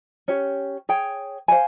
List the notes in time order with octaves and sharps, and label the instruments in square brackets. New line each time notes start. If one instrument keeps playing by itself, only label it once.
[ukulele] C#4 G4 C#5
G#4 C#5 G5
C5 F5 G#5